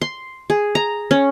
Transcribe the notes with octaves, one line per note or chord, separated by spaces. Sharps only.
C6
G#4
A#5
C#4